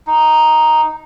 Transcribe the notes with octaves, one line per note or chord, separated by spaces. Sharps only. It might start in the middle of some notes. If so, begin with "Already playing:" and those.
D#4